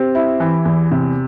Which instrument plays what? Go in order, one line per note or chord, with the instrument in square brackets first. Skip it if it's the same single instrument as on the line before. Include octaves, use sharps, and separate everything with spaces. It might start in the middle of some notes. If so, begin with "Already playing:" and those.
Already playing: [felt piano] C4 [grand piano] G4
[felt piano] E4
E3
E2
C3